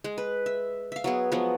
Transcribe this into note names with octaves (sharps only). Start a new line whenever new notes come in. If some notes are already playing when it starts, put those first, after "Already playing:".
G#3
B4
E5
E5 F5
F#3 B3 G#4
F3 F#3 G#3 B3